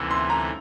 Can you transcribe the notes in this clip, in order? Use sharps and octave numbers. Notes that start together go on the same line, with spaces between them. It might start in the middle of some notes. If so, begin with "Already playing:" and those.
Already playing: D2 C3 E3 E6
C6
A#5